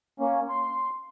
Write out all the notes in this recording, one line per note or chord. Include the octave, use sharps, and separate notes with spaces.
A#3 C#4
C6